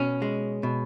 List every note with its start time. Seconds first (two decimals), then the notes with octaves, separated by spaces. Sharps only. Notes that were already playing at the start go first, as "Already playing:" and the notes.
Already playing: B2 C#4
0.22 G#3
0.63 B2